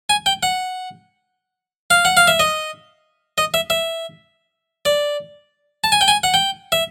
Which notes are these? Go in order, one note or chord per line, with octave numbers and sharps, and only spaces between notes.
G#5
G5
F#5
F5
F#5
F5
E5
D#5
D#5
E5
E5
D5
A5
G#5
G5
G#5
F#5
G5
E5